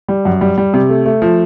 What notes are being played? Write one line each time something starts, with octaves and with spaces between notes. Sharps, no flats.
G3
F#2
G3
G3
C3
A3
A3
F3